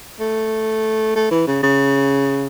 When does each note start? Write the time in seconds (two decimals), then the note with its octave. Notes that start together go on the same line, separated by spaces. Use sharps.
0.20 A3
1.15 A3
1.31 E3
1.47 C#3
1.63 C#3